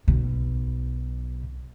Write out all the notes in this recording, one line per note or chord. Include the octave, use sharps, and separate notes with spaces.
B1 B2